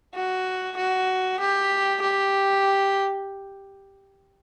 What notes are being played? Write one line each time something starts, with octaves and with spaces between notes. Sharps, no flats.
F#4
F#4
G4
G4